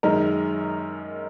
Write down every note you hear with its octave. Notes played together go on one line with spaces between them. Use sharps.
F#2 D#3 G#3 D#4 A#4